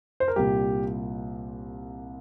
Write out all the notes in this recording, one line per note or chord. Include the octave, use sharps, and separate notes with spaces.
C5
A#4
C2 A#2 G3 G4